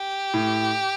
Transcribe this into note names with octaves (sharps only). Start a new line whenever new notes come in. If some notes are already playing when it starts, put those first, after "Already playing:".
Already playing: G4
A2